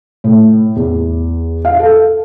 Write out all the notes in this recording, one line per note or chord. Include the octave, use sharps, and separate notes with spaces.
A2
E2
F5
A4